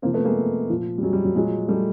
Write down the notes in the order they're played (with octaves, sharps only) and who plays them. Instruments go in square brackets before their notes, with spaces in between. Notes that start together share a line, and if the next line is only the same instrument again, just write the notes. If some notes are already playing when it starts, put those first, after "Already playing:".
[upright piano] C3 F3 A#3 C4
A3 B3
G#3 A#3
A#2 F3
G3
F#3 G#3
G3
F#3
A#2 F3 F#3 G#3
G3 A3